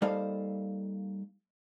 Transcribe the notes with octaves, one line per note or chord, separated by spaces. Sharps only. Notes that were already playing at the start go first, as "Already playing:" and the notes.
G3 A#3 D#4 A4 C5 F5